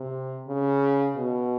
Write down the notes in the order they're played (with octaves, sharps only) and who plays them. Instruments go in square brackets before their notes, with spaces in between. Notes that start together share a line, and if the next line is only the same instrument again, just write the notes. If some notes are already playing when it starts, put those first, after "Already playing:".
Already playing: [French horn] C3
C#3
B2